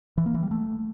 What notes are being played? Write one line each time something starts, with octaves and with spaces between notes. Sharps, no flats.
E3
A#3
E3
G3
A3